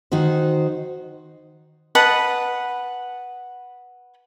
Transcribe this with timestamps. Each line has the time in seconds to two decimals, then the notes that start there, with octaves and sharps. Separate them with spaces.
0.12 D#3 D#4 F#4 C5
1.95 B4 D#5 F#5 A5